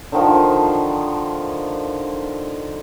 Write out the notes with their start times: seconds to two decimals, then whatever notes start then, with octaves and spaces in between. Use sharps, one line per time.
0.12 D3 D#3 F3